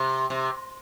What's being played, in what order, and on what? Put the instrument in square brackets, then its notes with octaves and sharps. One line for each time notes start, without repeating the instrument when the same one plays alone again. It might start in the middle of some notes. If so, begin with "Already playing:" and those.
Already playing: [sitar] C3
C3